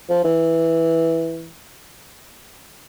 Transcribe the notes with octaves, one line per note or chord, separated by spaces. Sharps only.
F3
E3